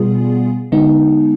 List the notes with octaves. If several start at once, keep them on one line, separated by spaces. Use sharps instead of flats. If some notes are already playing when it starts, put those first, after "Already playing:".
Already playing: B2 G3 B3 F4 G#4
D3 G#3 B3 D#4